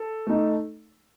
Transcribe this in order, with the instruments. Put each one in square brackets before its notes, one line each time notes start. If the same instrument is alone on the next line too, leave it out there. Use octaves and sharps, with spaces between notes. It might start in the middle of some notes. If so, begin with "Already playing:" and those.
Already playing: [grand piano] A4
A3 D#4